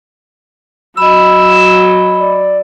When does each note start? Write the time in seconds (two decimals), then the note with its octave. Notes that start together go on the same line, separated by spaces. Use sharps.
0.97 F#3 D#5 B5 E6
2.19 D5